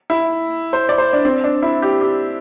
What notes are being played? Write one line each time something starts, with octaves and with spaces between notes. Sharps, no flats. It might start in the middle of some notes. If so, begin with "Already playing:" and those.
E4
C5
D5
C5
D4
C4
D4
E4
G4
G4